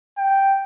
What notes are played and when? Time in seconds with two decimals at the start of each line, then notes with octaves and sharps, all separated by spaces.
0.18 G5